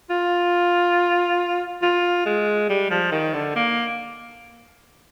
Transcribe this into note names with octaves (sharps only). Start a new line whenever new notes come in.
F4
F4
G#3
G3
F3
D#3
D3
A#3